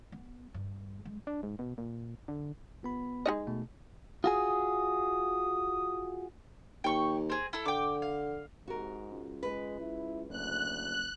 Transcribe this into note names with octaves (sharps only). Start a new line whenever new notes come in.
B3
G2
G#3
D4
G#2
B2
A#2
D3
G1 B3 B5
G#3 D#4 D#5
B2 A3
F4 F#4 G#4 D#6
D#2 G5 C#6
C4 G#4
E4 A4
D3 G5 D6
F5
G#2 C3 F#4 A#4
C#2
G#3 B4
E4
F#1 D2 F#6